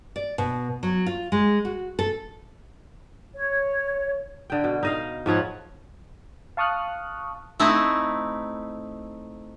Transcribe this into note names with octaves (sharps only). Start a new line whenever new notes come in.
D5
B2
F#3
F4
G#3
F#4
A4
C#5
D3 G5
B2
D#4 D#5 F5
G#2 F3 C#5 F#5
F5 A5 C#6 D#6 F6 F#6
A3 C4 D#4 E4